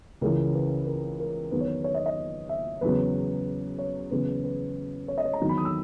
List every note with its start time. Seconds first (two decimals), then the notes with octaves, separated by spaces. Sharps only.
0.21 C#2 C#3 E3 A#4
0.55 B4
0.86 A#4
1.20 A#4
1.52 E2 D#3 F#3 B4
1.61 C#5
1.68 B4
1.84 C#5
1.95 D#5
2.06 D#5
2.49 E5
2.81 E2 C#3 F#3 B4
3.78 C#5
4.11 E2 C#3 F#3 B4
4.44 B4
5.08 C#5
5.18 D#5
5.25 C#5
5.33 A#5
5.41 E2 D#3 F#3
5.49 B5
5.58 D#6
5.65 E6